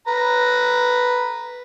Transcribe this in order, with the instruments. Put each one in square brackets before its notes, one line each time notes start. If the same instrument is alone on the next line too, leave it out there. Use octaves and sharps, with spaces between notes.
[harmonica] B4 A#5